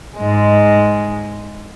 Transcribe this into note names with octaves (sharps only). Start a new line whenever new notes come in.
G#2 G#3